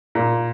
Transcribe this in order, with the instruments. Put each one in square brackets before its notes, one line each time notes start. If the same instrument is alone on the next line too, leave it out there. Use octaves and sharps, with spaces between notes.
[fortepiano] A#2